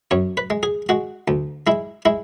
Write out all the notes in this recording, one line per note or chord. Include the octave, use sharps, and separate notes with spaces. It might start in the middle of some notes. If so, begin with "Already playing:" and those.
F#2 C#5
B4
G#3
G#4
G#3 F#4
D2
G#3 E4
G#3 E4